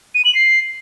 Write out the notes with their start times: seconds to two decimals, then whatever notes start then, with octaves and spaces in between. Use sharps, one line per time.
0.15 D#7
0.25 F#7
0.35 C7